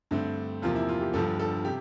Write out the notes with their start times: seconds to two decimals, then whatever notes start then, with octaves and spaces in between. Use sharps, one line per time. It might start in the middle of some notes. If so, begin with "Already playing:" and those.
0.11 G2 D3 A3 C4
0.62 E2 C3 F3 A#3 F4
0.76 E4
0.88 F4
1.01 G4
1.13 G1 G2 D3 F3 A4
1.39 A4
1.65 C3 G4